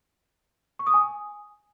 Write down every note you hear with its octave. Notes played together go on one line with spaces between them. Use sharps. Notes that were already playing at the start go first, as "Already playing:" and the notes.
C#6
D#6
G#5